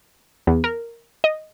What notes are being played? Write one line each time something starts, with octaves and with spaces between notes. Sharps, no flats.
E2
A#4
D#5